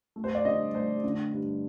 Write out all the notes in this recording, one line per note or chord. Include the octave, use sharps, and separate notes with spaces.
A3
C5
D5
D3 D#5
A3 C5
D3
G2